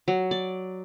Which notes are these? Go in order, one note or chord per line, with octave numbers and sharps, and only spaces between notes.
F#3
D5